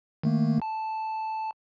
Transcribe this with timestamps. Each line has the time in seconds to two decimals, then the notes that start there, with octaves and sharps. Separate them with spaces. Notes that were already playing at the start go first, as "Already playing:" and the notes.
0.23 D#3 A3 A#3
0.62 A5